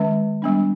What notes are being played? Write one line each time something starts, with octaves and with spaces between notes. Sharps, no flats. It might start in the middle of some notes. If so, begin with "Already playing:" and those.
Already playing: D#3 G#3 C#4
G3 B3 D4